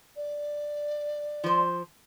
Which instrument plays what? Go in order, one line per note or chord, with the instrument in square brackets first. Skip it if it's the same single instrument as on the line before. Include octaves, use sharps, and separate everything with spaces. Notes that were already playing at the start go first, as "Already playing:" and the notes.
[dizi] D5
[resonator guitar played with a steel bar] F3 C5